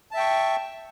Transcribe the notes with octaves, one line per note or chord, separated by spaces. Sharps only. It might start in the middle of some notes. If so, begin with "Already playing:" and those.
E5 G5 A5 C#6